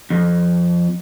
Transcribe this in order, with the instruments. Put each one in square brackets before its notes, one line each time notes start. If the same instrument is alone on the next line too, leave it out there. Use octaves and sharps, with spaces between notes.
[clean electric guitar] F2